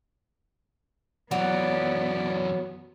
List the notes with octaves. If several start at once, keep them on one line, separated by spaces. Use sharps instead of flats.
F#2 E3 F#3 B3 D5